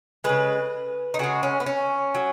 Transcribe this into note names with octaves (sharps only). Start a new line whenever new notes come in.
C#3 G#3 B4
D#4
C#3 G#3 F#4
C#4
B3
C#4
F#3